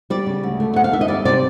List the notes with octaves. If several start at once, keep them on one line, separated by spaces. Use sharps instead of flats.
G3 D5
C#3
D2
A3
C#3 F#5
F5
D#2 E5
D#5
G3 D5
C3 D5